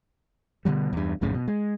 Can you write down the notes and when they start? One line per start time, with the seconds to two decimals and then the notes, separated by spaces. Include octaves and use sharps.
0.65 B2 D3 F#3 G3
0.93 E2 G2
1.21 A#1 F#2 A2 C#3
1.34 B2
1.48 G#3